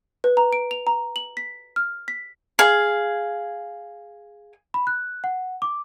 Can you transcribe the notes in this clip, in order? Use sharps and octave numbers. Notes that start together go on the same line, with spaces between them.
B4
A#5
D7
F7
A#5
F#7
B6
F6
B6
G#4 F5
B5
F#6
F#5
D6